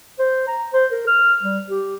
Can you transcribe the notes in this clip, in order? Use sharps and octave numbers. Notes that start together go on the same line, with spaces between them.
C5
A#5
C5
A#4
F6
G3
G4